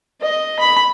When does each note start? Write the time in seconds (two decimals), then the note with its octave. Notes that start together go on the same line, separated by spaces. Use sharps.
0.21 D#5
0.59 B5